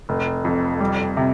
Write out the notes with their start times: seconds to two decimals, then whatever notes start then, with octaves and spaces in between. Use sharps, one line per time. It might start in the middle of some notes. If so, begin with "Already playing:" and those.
0.09 F1
0.45 F2
0.80 G3
1.17 C3